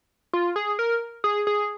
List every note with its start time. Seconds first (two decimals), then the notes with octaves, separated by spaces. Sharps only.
0.33 F4
0.56 G#4
0.79 A#4
1.24 G#4
1.47 G#4